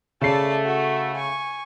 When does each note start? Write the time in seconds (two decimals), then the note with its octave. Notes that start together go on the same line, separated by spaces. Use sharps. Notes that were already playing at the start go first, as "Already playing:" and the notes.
0.21 C#3 A3 D5 A5 C7
0.65 F#4
1.17 G#5 C#6